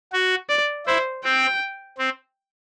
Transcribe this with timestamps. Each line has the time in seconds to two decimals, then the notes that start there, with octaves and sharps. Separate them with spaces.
0.13 F#4
0.49 D5
0.87 E4 C5
1.24 C4 G5
1.98 C4